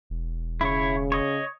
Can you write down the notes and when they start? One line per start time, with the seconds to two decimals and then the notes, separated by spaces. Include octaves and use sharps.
0.10 E1
0.61 C#3 E4 C#5
1.12 C#5 D#5